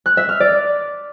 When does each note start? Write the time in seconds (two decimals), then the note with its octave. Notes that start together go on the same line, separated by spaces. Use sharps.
0.06 F#6
0.17 E5
0.29 F6
0.40 D5